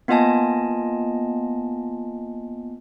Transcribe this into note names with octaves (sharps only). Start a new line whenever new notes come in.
A#3 B3 F4 D#5 G#5 A5